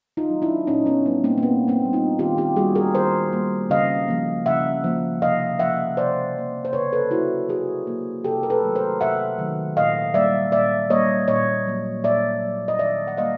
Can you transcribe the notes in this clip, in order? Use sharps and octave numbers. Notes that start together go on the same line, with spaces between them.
D#4 F4
F#3
A3
D4 E4
A#2 C#4 D#4
B3 C#4
G3 A#3 B3
A#3 C4
A#3
A#2 B3
A#3 C4
G3 A#3
D#4 F4
D#3 F4 G4
F4 G4
G3 A#3 F#4 G#4
G#4 A#4
D#3 A#4 C5
G3 A#3
C#3 D#5 F5
F3 A#3
C#3 E5 F#5
F3 A#3
C3 D#5 F5
F3 A#3 E5 F#5
C3 C5 D5
F3 A#3
C5
C#3 B4 C#5
A4 B4
F#3 A#3 E4 F#4
C#3 F#4 G#4
F#3 A#3
C3 G4 A4
A#4
A4 B4
D#3 F#3 A3
A#4 C5
C3 E5 F#5
D#3 F#3 A3
A#2 D#5 F5
G3 A#3 D5 E5
A#2 D5 E5
G3 A#3 C#5 D#5
A#2 C#5 D#5
F#3 A#3
A#2 D5 E5
F#3 A#3
D#5
D#3 D5 E5
F#5
G3 A#3 D#5 F5